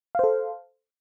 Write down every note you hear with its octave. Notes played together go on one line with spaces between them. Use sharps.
A4 C5 F5